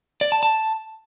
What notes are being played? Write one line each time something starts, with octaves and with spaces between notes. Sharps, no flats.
D5
A5
A5